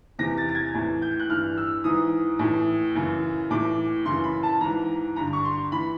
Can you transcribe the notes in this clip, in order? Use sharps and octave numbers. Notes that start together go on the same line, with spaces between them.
E2 C3 E3 A#6
A6
A6
G#6
A2 E3
G6
F#6
G2 E3 F6
E6
G#2 E3 D#6
A2 E3
F#2 C#3 E3
A2 E3 D6
F#2 C#3 E3 C6
B5
A5
G#2 E3 A#5
G2 D3 A#5
C#6
C6
E3 B5